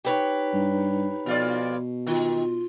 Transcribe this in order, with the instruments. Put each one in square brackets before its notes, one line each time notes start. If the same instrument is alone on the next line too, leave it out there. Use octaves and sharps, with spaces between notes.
[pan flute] D#4 [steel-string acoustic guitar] G4 B4 C#5
[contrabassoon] G2
[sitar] F2 F4 D5 [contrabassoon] B2
[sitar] D#3 [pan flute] F4